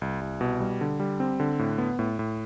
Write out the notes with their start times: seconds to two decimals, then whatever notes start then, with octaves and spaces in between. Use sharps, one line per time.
0.02 C2
0.21 C2
0.41 B2
0.60 G3
0.81 D3
1.00 G3
1.20 C4
1.40 D3
1.59 A2
1.78 B3
1.99 A2
2.19 A2